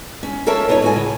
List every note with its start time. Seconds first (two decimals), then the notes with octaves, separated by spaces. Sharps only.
0.23 C#4
0.46 A#3 A4 A#4 C#5 E5 A5
0.69 B3 D#4 F4 C#5
0.82 A2 F#4 G#5
0.96 C#3